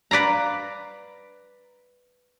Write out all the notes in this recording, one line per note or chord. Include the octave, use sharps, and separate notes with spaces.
B4 D5 F5 A#5